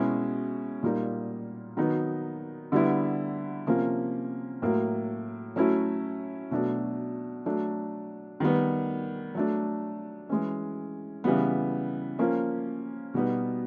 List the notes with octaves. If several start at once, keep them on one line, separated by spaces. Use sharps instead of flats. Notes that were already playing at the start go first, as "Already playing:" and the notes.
Already playing: B2 G#3 C#4 E4
A#2 G3 A#3 D#4
D#3 F#3 B3 D#4
D3 G3 B3 E4
C3 F3 A#3 C#4
A2 F#3 A#3
F#3 A3 C#4 E4
B2 F#3 A3 D4
F#3 A3 D4
D#3 G3 B3
F#3 A3 D4
E3 G#3 C#4
C#3 E3 G3 B3
F3 A#3 C#4
B2 G3 B3 D#4